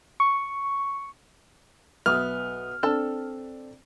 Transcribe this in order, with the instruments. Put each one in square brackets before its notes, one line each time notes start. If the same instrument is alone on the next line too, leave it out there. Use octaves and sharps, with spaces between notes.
[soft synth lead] C#6
[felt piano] B1 E5 D#6 [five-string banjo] B3 [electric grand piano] F6
[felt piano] C4 D4 [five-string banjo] A4 A5